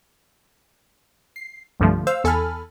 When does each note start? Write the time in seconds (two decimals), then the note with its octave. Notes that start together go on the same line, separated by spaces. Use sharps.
1.36 C7
1.80 C2 G2 D3 F3 A3
2.07 C5 F5 E6
2.24 E2 A4 G#5 A5 B5 F6